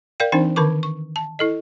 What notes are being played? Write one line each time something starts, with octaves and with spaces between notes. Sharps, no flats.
A#4 D5 F5 G5
E3 C4 D4 D#4 C5 G5
D3 D#3 A#4 A5 C#6 D6
C#6
A5
E4 A4 D#5